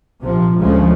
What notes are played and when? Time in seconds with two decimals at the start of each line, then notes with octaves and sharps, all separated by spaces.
0.22 A#1 C3 F3
0.60 D2 C#3 F3 G#3 A3